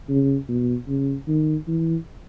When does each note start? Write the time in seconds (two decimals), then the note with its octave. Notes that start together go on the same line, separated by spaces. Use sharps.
0.09 C#3
0.48 B2
0.88 C#3
1.28 D#3
1.68 E3